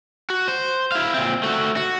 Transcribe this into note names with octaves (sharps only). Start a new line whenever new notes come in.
F#4
C5
E4 F5
A#2 C4
A3 F#4
F#4